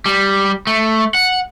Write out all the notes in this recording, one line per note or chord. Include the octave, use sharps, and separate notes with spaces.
G3
A3
F#5